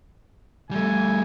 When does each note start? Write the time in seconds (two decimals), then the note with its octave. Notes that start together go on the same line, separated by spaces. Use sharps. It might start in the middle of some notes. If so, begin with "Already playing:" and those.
0.71 G3 A3 G#5